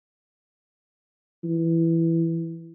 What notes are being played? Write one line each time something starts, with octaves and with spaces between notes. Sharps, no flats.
E3